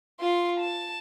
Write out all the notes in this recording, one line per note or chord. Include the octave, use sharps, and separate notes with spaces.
F4 C6
A5